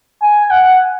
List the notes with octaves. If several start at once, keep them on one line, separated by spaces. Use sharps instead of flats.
G#5
F#5